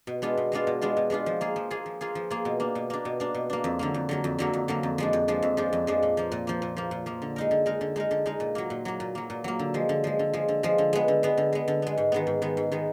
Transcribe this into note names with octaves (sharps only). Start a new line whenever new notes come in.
B2
G#3 B3 D4 F4
B2
G#3 B3 D4 F4
B2
G#3 B3 D4 F4
B2
G#3 B3 D4 F4
F3
A#3 F4 G#4
F3
A#3 F4 G#4
F3
A#3 F4 G#4
F3
A#3 F4 G#4
B2
A#3 D4
B2
A#3 D4
B2
A#3 D4
B2
A#3 D4
F2
D3 F#3 A#3
F2
D3 F#3 A#3
F2
D3 F#3 A#3
F2
D3 F#3 A#3
F2
F3 G#3 D4
F2
F3 G#3 D4
F2
F3 G#3 D4
F2
F3 G#3 D4
A#2
F3 A#3
A#2
F3 A#3
A#2
F3 A#3
A#2
F3 A#3
D3
G#3 D#4 A#4
D3
G#3 D#4 A#4
D3
G#3 D#4 A#4
D3
G#3 D#4 A#4
A#2
F#3 A#3
A#2
F#3 A#3
A#2
F#3 A#3
A#2
F#3 A#3
D3
F3 G#3
D3
F3 G#3
D3
F3 G#3
D3
F3 G#3
D3
G#3 B3
D3
G#3 B3
D3
G#3 B3
D3
G#3 B3
G#2
D#3 G#3 B3
G#2
D#3 G#3 B3
G#2
D#3 G#3 B3